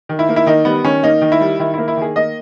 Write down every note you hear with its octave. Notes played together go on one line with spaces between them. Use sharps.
D#3
E4
A#3
E4
D#3 D#4
G3 B3
D#3 C#4
A#3 D#4
D#3
E4
G3
D#3 E4
A#3 E4
E4
D#3 G#4
A#3 D#5